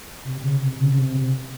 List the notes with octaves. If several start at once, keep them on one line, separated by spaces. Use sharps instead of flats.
C3
C#3
C3
C#3
C#3
C3